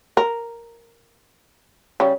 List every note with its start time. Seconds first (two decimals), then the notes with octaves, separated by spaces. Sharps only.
0.17 A#4
2.00 C#3 G3